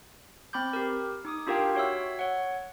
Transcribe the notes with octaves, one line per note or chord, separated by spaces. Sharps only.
C4 B5 D6 G6
G4 A#4
D#4 D6 D#6
D4 F4 G4 A#4 F5 G5
F#4 C#5 E5 E6
C#5 F#5